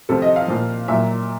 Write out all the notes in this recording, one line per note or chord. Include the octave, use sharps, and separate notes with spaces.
C3 F3 A4
D#5
F5
A#2 F3
A#2 F#3 E5